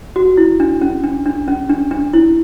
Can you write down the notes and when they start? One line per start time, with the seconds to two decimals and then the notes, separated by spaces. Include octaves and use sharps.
0.16 F#4
0.37 E4
0.60 D4
0.81 C#4
1.04 D4
1.26 D4
1.48 C#4
1.70 D4
1.91 D4
2.13 E4